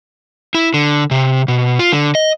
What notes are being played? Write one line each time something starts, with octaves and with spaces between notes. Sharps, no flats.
E4
D3
C3
B2
F4
D3
D#5